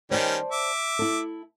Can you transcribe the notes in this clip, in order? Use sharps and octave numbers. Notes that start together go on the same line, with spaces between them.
D#3 G3 C#4 C5 D5 A5
E5 D6
E4 A4